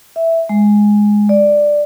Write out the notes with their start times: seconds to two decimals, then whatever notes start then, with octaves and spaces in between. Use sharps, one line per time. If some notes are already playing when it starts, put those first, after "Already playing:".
0.16 E5
0.49 G#3
1.29 D5